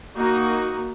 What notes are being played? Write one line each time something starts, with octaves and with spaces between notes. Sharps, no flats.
A#3 D#4 F#4